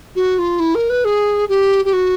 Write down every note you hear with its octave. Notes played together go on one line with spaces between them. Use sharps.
F#4
F4
E4
A#4
B4
G#4
G4
G4
F#4